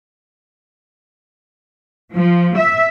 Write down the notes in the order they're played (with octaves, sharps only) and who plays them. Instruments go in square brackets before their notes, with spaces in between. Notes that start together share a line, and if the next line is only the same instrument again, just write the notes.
[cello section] F3
E5